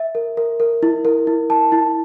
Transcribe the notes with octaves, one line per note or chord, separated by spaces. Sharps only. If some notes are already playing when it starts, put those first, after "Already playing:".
Already playing: E5
A#4
A#4
A#4
E4
A#4
E4
A5
E4